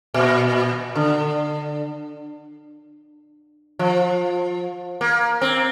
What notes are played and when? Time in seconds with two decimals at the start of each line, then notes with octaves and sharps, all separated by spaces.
0.14 A#2
0.95 D3
3.79 F3
5.01 A#3
5.41 C4